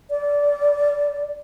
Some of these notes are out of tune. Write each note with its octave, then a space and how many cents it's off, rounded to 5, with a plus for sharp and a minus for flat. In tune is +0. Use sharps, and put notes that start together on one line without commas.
D5 -15